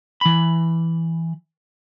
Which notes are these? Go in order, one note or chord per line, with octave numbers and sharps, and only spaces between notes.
E3 B5